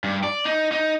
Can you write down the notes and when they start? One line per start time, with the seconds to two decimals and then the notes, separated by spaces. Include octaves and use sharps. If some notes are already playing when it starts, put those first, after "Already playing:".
0.04 G2
0.24 D5
0.45 D#4
0.72 D#4